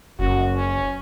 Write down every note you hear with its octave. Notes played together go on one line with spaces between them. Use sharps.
F#1 F#2 F#4
C#4